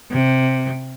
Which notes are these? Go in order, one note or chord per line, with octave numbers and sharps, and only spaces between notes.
C3